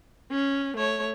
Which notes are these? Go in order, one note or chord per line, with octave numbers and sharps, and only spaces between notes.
C#4
A3 C#5